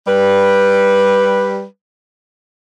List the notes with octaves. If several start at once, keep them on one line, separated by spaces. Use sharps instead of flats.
G3 B4